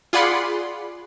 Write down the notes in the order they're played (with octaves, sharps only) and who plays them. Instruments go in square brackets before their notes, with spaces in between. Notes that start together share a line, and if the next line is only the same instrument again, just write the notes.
[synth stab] F4 G#4 D5 F#5 B5 C6